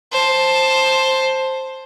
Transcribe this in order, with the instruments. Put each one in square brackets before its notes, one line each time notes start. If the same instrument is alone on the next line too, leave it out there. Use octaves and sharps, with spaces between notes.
[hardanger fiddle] C5 A5